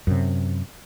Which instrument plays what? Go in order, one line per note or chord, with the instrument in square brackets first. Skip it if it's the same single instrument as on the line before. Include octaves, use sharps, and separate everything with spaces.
[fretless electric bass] F#2 C3